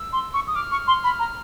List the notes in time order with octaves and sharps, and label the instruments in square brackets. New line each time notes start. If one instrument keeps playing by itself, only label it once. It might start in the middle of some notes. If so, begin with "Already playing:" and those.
Already playing: [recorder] E6
[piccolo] C6
C#6
D#6
[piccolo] D6 [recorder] F6
[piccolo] C#6
C6
B5
A#5